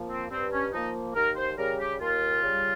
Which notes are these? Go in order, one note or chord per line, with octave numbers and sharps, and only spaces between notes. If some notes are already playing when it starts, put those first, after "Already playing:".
Already playing: F3 A#3
C4
G2 C4
C#4
F3 A#3 D#4
D#2 A#4
C5
C#3 G3 A#4
G4
D#2 F4
C#3 G3